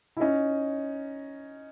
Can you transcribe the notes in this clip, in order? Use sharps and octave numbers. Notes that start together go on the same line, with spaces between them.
E4
C#4 D#4